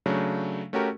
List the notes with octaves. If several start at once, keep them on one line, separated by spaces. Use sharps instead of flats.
C#3 F#3 A3 D4
A3 C#4 F#4 G4 A#4